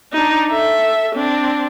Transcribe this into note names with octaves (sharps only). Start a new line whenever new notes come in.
D4 D#4
A4 E5
C4 D4